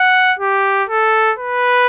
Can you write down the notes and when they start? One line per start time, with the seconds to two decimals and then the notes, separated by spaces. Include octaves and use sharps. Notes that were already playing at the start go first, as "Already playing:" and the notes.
Already playing: F#5
0.39 G4
0.89 A4
1.39 B4